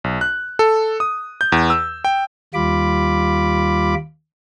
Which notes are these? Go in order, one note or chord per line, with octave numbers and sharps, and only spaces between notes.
B1
F#6
A4
D#6
G6
E2
E6
G5
D#2 G3 F4 B5 D6